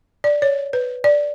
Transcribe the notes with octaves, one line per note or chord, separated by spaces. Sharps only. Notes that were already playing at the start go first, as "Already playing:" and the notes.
D5
C#5
B4
D5